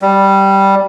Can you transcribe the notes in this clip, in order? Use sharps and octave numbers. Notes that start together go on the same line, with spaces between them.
G3